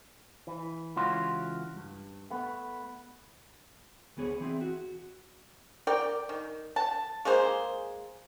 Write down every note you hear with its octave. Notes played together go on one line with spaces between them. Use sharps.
E3
C#2 E3 C#4 F4 F#4 C6
G2
A3 B3
D2 B3 G#4 C#5
E3 C4 E4 G#4
F#4
A#4 D5 G5
D#3
A5
G#3 A#3 G#4 C5